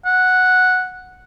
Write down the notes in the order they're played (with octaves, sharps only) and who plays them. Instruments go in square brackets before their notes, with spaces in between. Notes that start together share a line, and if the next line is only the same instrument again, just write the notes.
[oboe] F#5